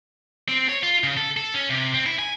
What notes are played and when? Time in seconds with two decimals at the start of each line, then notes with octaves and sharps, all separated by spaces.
0.49 C4
0.69 C#5
0.83 F4
1.04 C#3
1.17 A4
1.37 A4
1.54 C#4
1.70 C3
1.94 C4
2.06 E4
2.19 G#5